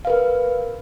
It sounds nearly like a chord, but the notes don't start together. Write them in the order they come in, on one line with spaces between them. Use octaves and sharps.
F5 B4 A#4